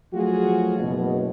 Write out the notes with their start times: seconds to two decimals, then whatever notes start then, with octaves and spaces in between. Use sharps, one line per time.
0.13 F3 F#3 A3 F4 F#4 G#4
0.79 F#1 B2